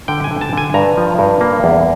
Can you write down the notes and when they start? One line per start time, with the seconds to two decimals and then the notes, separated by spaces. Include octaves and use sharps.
0.08 D3 G5
0.24 G#5
0.31 D3
0.41 A5
0.53 D3 G#5
0.74 G2 A#5
0.97 F3
1.19 G2
1.41 A#3
1.64 E2